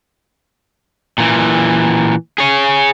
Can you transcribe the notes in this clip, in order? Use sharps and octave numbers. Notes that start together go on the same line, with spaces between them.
A#2 E3
G#4 C#5